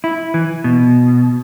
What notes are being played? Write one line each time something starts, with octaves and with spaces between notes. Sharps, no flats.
E4
E3
B2